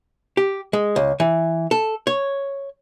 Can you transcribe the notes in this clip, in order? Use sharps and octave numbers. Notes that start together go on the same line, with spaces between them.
G4
G#3
C#2
E3
A4
C#5